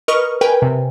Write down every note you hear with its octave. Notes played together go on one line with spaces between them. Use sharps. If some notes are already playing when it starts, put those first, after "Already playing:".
A#4 B4 D#5 C#6 D#6 F6
A#4 B4 G5 G#5
C3